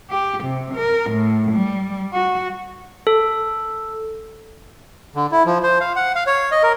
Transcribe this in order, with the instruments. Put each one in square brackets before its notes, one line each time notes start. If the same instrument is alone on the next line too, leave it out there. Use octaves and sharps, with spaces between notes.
[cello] G4
C3
A#4
A2
G3
F#4
[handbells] A4
[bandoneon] D3
E4
F3
C5
F5
F#5
F5
C#5
D#5
A#4